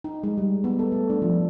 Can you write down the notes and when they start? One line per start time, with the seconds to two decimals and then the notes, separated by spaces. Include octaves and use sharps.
0.04 D#4
0.24 G#3
0.38 G3
0.64 B3
0.79 A4
0.92 A3
1.10 D4
1.22 F3